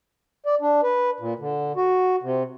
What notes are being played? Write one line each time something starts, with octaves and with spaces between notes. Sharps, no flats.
D5
D4
B4
A#2
D3
F#4
C3